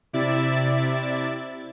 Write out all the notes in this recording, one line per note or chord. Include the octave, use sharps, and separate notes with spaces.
C3 E4 D5 E5 A6